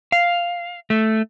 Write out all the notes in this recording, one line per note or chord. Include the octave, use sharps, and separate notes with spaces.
F5
A3